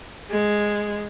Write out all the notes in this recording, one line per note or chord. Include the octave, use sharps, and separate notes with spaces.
G#3